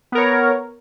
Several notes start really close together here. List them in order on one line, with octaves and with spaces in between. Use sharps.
B3 A#4 C#5